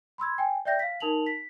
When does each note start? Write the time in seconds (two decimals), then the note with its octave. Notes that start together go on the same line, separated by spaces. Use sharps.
0.18 B5 C6 E6 G#6
0.38 G5 G#5
0.65 D5 E5 G5 G6 A#6
0.79 F5 B6
1.00 D#4 A#4 A5 F7 F#7
1.27 B6